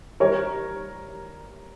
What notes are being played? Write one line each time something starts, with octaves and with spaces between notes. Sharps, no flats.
G3 A#4 C#5